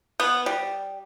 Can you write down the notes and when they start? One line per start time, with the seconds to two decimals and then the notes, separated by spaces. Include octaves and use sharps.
0.20 B3
0.46 G3